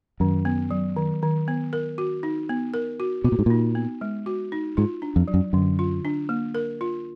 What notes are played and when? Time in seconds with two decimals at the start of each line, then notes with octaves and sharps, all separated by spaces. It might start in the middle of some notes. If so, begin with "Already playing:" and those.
0.20 F#2 D#3
0.45 B3
0.71 F#3
0.96 D#3
1.23 D#3
1.48 B3
1.73 A#4
1.98 F#4
2.23 D#4
2.49 B3
2.74 A#4
3.00 F#4
3.24 B2 F#4
3.32 A#2
3.39 G#2
3.46 A#2 D#4
3.75 B3
4.01 G#3
4.26 F#4
4.52 D#4
4.77 G#2 F4
5.02 D4
5.16 F2
5.28 F#3
5.34 F#2
5.53 F#2 D3
5.79 F4
6.05 D4
6.29 A#3
6.55 A#4
6.81 F4